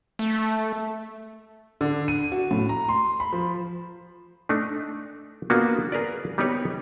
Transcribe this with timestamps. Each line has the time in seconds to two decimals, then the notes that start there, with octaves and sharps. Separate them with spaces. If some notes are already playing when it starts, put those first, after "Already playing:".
0.19 A3
1.81 D3
2.08 D#7
2.32 F#4
2.51 A2
2.69 A#5
2.89 C6
3.20 B5
3.33 F3
4.49 A3 D4 D#4
5.50 A#3 B3 D4 F4 F#4
5.92 G#4 A#4 B4 D5
6.38 G3 B3 D#4 G4 B4 C#5